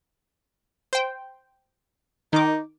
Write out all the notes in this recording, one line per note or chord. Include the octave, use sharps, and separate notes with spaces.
C5 G5
D#3 D#4 D6